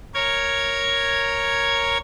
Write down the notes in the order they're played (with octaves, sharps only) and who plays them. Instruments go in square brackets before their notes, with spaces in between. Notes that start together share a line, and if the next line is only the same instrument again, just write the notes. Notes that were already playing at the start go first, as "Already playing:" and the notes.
[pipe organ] A#4 C#5 G#6